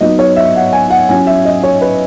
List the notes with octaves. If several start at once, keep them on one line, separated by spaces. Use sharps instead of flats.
F#3 B3 D#4 D#5
C#5
E5
F#5
G#5
F#5
F#3 C#4 E4 G#5
E5
D#5
C#5
B4